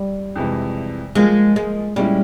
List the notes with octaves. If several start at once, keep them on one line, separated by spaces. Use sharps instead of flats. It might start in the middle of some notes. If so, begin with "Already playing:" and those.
Already playing: G3
F2 C3 E3 G#3
F3 G#3 A#3 F4
G#3
A#2 G3 G#3 C#4 E4